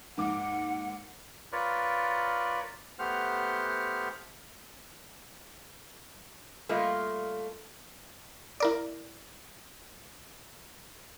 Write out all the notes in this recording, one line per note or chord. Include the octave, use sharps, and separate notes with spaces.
D#2 G#2 F#5 D6
F4 A#4 B4 C#5 D5
A3 B3 G4 C5 F#5 F6
G3 A3 A#3 F4 D#5
E4 A#4 D5